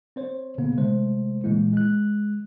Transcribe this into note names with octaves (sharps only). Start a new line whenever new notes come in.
C4 C5 C#5
A#2 C#3 A#3 B3
C3 D#3 G#3 A3 C5
A#2 E3 G#3 A#3 E4
G#3 F#6